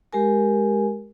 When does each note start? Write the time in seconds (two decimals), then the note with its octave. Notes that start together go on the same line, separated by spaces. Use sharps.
0.13 G#3 G4 A#4 G#5